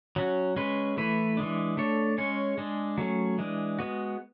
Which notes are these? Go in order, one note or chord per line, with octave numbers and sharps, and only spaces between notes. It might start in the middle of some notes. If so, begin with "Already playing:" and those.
F#3 C#4 F#4
G#3 C#4 G#4 B4
E3 A3 E4 B4
E3 G#3 D4
A3 D4 A4 C#5
G#3 C#4 G#4 C#5
G#3 D4 G#4
F#3 A3 C#4 G#4
E3 G#3 D4
G#3 B3 F#4